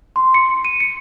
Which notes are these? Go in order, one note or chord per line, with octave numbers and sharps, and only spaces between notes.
C6
C#7
D#7
C#7